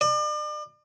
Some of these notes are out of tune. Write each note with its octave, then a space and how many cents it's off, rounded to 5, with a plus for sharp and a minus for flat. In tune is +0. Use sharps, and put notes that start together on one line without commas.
D5 +40